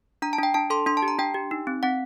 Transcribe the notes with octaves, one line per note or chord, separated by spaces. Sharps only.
D4 A#5
A5
D4 G5
D4 A5
A4 C6
D4 C6
A5
G4
A#5
D4 G5
G4
D#4
C4
C4 F#5